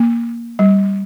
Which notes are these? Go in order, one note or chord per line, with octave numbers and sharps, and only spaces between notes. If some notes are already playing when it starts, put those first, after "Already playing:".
Already playing: A#3
G3